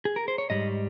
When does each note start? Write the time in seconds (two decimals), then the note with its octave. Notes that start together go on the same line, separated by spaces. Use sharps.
0.05 G#4
0.16 A#4
0.28 C5
0.38 C#5
0.50 G#2 G3 D#5